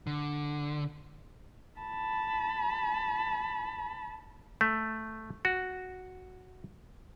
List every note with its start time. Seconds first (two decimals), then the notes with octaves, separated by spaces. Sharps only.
0.07 D3
1.80 A5 B5
4.61 A3
5.45 F#4